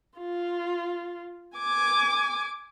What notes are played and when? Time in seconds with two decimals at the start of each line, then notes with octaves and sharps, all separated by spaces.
0.18 F4
1.57 G#5 D6